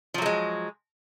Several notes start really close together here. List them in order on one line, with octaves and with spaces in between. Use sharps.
F3 F#3 A3 G#3